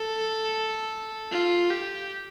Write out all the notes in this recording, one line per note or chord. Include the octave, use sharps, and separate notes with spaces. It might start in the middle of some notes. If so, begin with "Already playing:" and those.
Already playing: A4
F4
G4